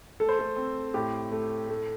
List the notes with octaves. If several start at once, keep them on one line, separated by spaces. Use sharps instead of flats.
A3 A4
C5
A3 A4
C4
A2 G4
A3
A3